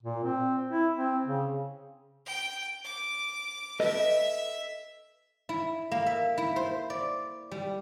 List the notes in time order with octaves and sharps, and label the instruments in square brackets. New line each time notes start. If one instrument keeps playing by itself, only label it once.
[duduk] A#2
C4
E4
C4
C#3
[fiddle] G5
D6
[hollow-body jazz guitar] A4 B4 D#5 [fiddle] E5
[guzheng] E4
A#3
E5
E4
C5
D5
G3